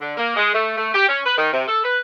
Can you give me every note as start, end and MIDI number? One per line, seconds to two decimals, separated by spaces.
0.01 0.13 50
0.17 0.35 58
0.36 0.51 56
0.54 0.75 57
0.78 0.89 57
0.94 1.07 67
1.09 1.21 61
1.26 1.35 71
1.38 1.52 51
1.53 1.68 48
1.68 1.80 69
1.84 1.99 71